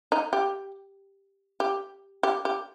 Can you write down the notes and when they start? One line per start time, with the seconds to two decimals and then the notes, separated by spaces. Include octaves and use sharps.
0.12 D#4
0.33 G4
1.60 G4
2.23 G4
2.45 G4